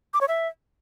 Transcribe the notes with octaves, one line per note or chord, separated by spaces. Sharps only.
D6
C#5
E5